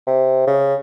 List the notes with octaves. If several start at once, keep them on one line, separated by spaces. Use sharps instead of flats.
C3
C#3